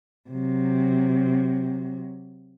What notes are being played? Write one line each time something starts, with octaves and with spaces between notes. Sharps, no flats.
C3 F#3